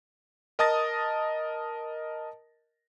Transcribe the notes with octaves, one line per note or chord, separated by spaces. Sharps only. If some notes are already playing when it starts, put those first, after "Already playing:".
A#4 D#5 A5 D#6 A6 A#6